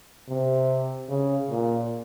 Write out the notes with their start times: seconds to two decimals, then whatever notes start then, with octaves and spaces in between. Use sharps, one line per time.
0.28 C3
1.09 C#3
1.50 A#2